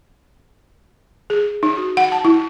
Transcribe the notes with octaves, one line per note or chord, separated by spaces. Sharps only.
G#4
D#4
F#4
F#5
A5
E4